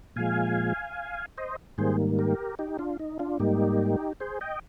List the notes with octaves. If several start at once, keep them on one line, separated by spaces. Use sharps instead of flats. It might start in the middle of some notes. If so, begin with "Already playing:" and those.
A#2 F3 G#3 F5 G#5
C5 D#5
G#2 D#3 G3 A#3 G#4 C5
G4 A#4
D#4 G4
D4 F4
D#4
D4 F4
G#2 G3 A#3 D#4 G4
G#4 C5
D#5 G5